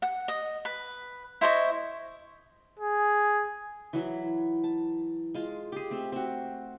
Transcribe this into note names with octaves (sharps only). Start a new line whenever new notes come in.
F#5
D#5
B4
E4 C5 D#5 C#6
G#4
E3 F#3 E4
A5
G#3 F4
G4 G#4
A3 C4
C4 F#4